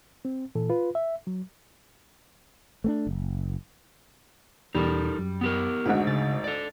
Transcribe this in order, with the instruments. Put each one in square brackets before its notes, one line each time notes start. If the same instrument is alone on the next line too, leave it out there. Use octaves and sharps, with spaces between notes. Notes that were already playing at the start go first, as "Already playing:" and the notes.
[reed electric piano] C4
A#2 E3 A4
F4 B4
E5
F#3
[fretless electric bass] A3 B3 D4
F#1
[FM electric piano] E2 B2 [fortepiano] G3 [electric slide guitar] D#4 A4 A#4
[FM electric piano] F#2
[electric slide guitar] B3 G4 A#4
[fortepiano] G#1 D2 G#2 [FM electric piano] F#4 F#5
[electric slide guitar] C#3 [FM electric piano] A6
[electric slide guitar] A4 D5